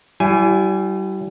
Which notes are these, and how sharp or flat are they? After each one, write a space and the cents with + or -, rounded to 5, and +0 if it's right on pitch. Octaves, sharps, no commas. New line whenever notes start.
G3 -35 E4 +20 G#5 +0